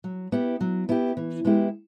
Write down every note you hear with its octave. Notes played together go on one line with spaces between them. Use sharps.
F#3
B3 E4 G4
F#3
B3 E4 G4
E3
G#3 B3 E4 G4